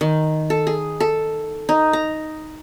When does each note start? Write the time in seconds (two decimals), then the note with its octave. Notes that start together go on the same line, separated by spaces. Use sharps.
0.01 D#3
0.50 A4
0.67 G#4
1.00 A4
1.69 D#4
1.93 A#5